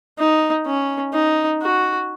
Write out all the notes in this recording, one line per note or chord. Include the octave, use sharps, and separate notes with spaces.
D#4
C#4
D#4
F#4